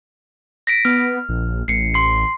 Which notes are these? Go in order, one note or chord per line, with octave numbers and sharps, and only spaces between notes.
A#6 B6 D7
B3 F6
A#1
A1 C7 C#7
C6 C7